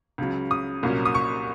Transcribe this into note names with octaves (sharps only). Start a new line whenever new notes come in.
C#2 C#3 F#3
D#6
C2 A#2 F#3 A#3 C#4
D#6
C#6